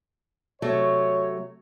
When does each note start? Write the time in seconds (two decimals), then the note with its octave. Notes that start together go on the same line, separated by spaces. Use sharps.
0.62 C3 F#3 A3 C#5